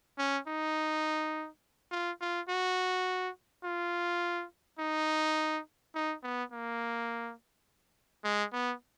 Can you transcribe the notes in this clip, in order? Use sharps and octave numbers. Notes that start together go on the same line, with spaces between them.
C#4
D#4
F4
F4
F#4
F4
D#4
D#4
B3
A#3
G#3
B3